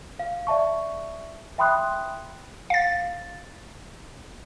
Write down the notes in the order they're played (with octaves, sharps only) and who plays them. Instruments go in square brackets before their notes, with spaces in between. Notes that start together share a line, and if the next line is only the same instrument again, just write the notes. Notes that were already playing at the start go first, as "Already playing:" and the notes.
[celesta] F5
D5 E5 A5 C#6
E5 G5 B5 C6 D#6 F#6
[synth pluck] F5 A6